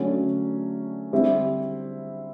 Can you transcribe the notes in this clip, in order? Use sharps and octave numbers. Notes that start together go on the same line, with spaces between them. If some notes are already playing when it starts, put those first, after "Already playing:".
Already playing: D3 F#3 A3 C#4
D3 G3 C4 E4